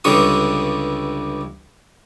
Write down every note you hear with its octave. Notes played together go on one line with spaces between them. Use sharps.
C#2 G2 D3 C#6 D#6